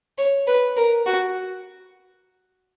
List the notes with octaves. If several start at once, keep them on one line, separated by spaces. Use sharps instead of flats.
C#5
B4
A#4
F#4